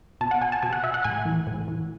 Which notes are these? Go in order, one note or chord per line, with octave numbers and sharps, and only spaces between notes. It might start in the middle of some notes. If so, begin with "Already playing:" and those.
B2 A5
F#5
G#5
A5
B2 G#5
F#5
E5
F#5
A2 G#5
E3
A2
E3